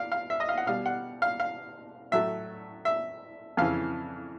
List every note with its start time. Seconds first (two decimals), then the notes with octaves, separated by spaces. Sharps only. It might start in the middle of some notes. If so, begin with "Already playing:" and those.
Already playing: D5 F5
0.12 F5
0.30 E5
0.40 D#5
0.49 F5
0.58 F#5
0.67 B2 G3 F5
0.86 F#5
1.22 F5
1.40 F5
2.12 A2 F#3 A3 E5
2.85 E5
3.57 F2 C#3 E3 F5